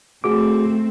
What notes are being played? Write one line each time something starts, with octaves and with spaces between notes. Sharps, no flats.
A3 C4 F#4 G#4 D6